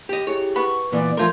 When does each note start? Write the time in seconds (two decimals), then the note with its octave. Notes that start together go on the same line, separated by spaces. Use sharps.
0.09 G4 D#5
0.27 E4 G4 G#4 C#5
0.56 B4 F#5 B5 C#6
0.92 A#2 E3 B3 D5
1.17 F3 A3 F4 A#4 C6 G6 G#6